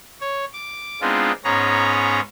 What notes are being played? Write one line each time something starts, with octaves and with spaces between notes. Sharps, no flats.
C#5
D6
G#3 B3 C4 D4 D#4 F4
G#2 B3 C#4 G#4 C#5 A#5